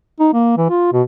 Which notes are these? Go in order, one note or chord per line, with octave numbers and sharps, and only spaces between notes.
D#4
A#3
E3
F4
B2